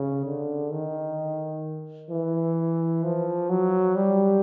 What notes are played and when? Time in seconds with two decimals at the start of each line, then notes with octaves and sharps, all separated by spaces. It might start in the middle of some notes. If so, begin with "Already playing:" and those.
Already playing: C#3
0.25 D3
0.72 D#3
2.11 E3
3.04 F3
3.50 F#3
3.96 G3